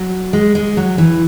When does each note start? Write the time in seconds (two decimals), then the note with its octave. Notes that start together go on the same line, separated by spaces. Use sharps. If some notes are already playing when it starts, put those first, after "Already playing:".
Already playing: F#3
0.33 G#3
0.55 G#3
0.77 F#3
0.98 E3